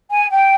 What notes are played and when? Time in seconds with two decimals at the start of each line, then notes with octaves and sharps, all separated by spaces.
0.11 G#5
0.31 G5